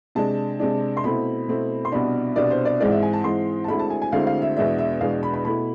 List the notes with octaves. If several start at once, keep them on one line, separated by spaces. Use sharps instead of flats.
C3 G#3 D4 A5
C3 G#3 D4
C6
B2 A3 C4 E4 B5
B2 A3 C4 E4
C6
C2 B2 B3 D4 B5
C2 B2 B3 D4 D5
C5
D5
G#2 E3 G#3 C4 D5
E5
G#5
A5
G#2 E3 G#3 C4 C6
A5
D2 D3 G#3 C4 E4 B5
A5
G#5
G#5
D2 D3 G#3 C4 E4 F5
F5
E5
E2 B2 G#3 D4 E5
E5
E2 B2 G#3 D4 F5
B5
B5
B2 A3 E4 B5